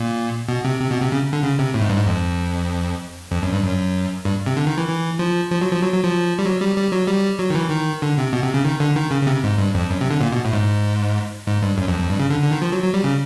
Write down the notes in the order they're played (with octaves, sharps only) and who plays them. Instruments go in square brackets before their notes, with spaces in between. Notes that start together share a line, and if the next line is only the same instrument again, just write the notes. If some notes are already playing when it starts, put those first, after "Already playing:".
Already playing: [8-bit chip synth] A#2
B2
C3
C3
B2
C3
C#3
D3
C#3
C3
A2
G#2
G2
G#2
F2
F2
F#2
G2
F#2
G2
C3
D3
D#3
E3
E3
F3
F3
F#3
F3
F#3
F#3
F3
G3
F#3
G3
G3
F#3
G3
F#3
D#3
E3
D#3
D3
C3
B2
C3
C#3
D#3
D3
D#3
C#3
C#3
C3
G#2
G2
F2
F#2
C3
D3
A#2
B2
A2
G#2
G#2
G2
F#2
F2
F2
G2
C#3
D3
D3
D#3
F3
F#3
F#3
G3
C#3